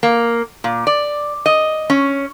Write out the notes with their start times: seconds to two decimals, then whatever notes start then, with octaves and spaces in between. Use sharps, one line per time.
0.03 A#3
0.64 A#2
0.87 D5
1.46 D#5
1.90 C#4